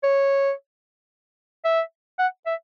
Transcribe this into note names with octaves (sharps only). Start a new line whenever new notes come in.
C#5
E5
F#5
E5